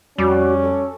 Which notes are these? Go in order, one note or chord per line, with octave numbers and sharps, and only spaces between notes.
F2 G3 C#4 F#4 D6
A4